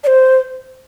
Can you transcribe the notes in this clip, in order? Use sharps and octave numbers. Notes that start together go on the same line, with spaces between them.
D5
C5